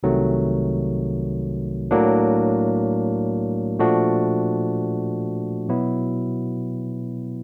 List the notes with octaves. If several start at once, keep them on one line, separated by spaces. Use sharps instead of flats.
C2 C3 D#3 F#3 A3
A2 F#3 A#3 D4
A#2 F3 A3 D4 F#4
B2 F#3 B3 E4